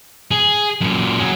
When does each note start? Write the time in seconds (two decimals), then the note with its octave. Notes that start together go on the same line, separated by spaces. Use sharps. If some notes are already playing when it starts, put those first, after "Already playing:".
0.31 G#4
0.81 F#2 A#2
1.20 F#3 G#4